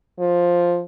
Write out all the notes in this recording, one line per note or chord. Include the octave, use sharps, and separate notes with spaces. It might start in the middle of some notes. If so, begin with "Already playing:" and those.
F3